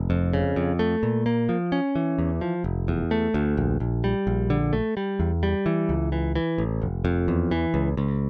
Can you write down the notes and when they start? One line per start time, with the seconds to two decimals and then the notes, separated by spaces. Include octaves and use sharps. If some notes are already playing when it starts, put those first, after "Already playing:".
Already playing: F1
0.10 F2
0.34 C#3
0.56 F2
0.79 A3
1.03 A#2
1.26 A#3
1.49 F3
1.72 C#4
1.95 E3
2.19 E2
2.41 F3
2.64 F1
2.88 E2
3.11 A3
3.34 D2
3.57 A#1
3.80 A#1
4.04 G3
4.27 A#1
4.50 D3
4.73 A3
4.97 G3
5.20 E2
5.43 G3
5.66 E3
5.89 C#2
6.12 E3
6.35 E3
6.58 A1
6.82 F1
7.05 F2
7.28 E2
7.51 E3
7.74 C#2
7.97 C#2